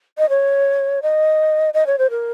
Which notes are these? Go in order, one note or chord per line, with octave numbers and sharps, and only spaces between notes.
D#5
C#5
D#5
D#5
C#5
C5
A#4